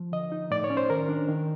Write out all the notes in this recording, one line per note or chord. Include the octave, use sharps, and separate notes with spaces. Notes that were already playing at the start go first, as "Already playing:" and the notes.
Already playing: F3
D3 D#5
D#4
A2 D5
C#5
C#4
C5
D#3 A#4
D4
D#3